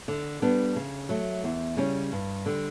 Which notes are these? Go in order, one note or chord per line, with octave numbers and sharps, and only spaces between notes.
D3
G3 B3 D4
C#3
F#3 A3
E2
C#3 G3 C#4
G2
D3 G3